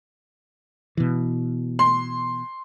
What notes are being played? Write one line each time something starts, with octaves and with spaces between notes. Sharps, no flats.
B2 E3
C6